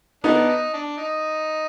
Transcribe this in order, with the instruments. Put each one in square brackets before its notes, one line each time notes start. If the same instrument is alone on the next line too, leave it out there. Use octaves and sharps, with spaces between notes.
[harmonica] A#3 D4 [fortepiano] B3 D#4
[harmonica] D#4
D4
D#4